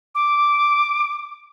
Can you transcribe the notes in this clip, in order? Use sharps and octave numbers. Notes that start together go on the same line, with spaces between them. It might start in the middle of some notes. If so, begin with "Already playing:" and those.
D6